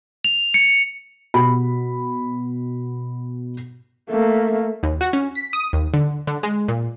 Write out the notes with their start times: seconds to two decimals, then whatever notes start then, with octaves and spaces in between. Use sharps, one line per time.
0.24 F7
0.54 C#7
1.34 B2 F#4 B5
4.10 A3 A#3
4.83 D#2
5.01 F#4
5.13 C#4
5.35 B6
5.53 D#6
5.73 D#2
5.94 D3
6.27 D3
6.43 G#3
6.68 A#2